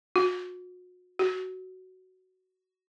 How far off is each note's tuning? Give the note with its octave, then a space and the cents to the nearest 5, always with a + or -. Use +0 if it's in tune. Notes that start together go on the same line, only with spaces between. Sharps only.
F#4 -35
F#4 +10